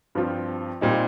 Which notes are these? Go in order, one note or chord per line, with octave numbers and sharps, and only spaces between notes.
G2 F3 C4 F4
A#2 G3 C4 D#4